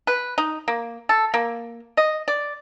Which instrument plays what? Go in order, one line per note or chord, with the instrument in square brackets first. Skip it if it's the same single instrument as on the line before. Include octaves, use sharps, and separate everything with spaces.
[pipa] B4
D#4
A#3
A4
A#3
D#5
D5